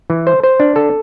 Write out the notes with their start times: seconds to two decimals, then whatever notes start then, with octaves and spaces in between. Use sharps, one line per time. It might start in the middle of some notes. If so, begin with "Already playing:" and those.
0.10 E3
0.27 C5
0.44 C5
0.60 D4
0.76 A4